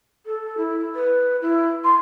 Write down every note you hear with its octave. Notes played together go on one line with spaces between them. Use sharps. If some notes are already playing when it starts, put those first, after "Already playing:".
A4
E4
B4
E4
C6